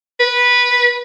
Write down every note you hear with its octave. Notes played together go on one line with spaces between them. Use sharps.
B4